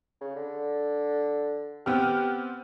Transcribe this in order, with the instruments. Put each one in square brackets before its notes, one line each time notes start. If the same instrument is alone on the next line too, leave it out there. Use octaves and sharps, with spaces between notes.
[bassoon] C#3
D3
[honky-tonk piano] B3 C4 F6 [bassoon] G4